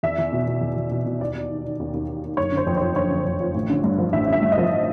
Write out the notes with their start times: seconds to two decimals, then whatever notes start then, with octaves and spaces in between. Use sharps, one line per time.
0.03 E2 E5
0.18 E2
0.33 B2
0.47 B2
0.61 E2
0.76 E2
0.91 B2
1.06 B2
1.20 D#2 D5
1.35 D#2
1.50 D#3
1.65 D#3
1.80 D#2
1.94 D#2
2.09 D#3
2.22 D#3
2.37 F#1 C#5
2.52 D3
2.57 C5
2.67 F2
2.77 F3 C5
2.96 F#1 C#5
3.11 D3
3.25 F2
3.40 F3
3.55 A1
3.70 D3
3.84 G2
3.98 F3
4.13 A1 E5
4.28 D3 E5
4.42 G2
4.52 D#5
4.58 F3